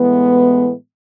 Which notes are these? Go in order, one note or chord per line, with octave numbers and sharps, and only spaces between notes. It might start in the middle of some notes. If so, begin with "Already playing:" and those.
Already playing: A2 E3 G#3 B3